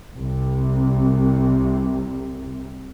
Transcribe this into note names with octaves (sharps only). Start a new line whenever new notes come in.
C2 C3